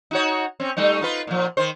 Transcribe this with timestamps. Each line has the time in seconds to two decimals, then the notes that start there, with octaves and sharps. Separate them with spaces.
0.11 D#4 F#4 C#5
0.60 C4 C#4
0.77 G3 A3 D#4
1.01 D#4 F4 B4
1.27 A#2 F3
1.57 D#3 C5